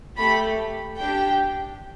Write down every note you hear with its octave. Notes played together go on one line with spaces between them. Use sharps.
A3 G4 B5
D4 G4 G5